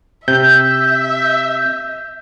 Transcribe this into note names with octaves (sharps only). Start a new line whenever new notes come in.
C3 E5 G6